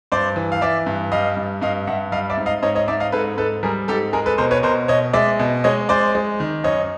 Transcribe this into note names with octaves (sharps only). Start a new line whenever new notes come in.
G2 C5 D5
E3
F5
E3 D5 E5
G2
G3 D#5 F5
G2
G2 D#5 F5
G2 E5 F#5
G3 D#5 F5
D5 E5
G#2
D#5 F5
G#2 C#5 D#5
C#5 D#5
G#2 D5 E5
D#5 F5
G#2 A4 B4
G#2 A4 B4
G3 G#4 A#4
G#2 G4 A4
G#3 G#4 A#4
A4 B4
B2 A#4 C5
B4 C#5
B2 A#4 C5
B2 C#5 D#5
G#3 D5 E5
B2
G#3 C#5 D#5
G#3 C5 D5
G#3
D#3
F#2 C#5 D#5